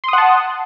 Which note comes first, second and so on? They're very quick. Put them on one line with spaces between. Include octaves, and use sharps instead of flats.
C6 D#6 F#5 A5